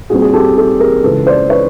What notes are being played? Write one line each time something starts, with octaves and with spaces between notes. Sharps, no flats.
A#2 G3 C4 F#4 G#4
G#4
G4 A4
G4 A4
G#4 A#4
C#2 C#3 E3 A4 B4
C5 D5
B4 C#5